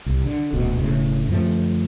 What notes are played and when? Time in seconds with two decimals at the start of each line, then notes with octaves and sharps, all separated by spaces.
0.06 C2
0.24 D3
0.53 D#1 D2 B2
0.76 E1 A2 C#3
1.29 F#2 D3 F3 A3